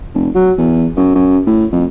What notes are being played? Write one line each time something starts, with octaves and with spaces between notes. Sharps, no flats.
F1
F#3
E2
F#2
F#2
A2
F2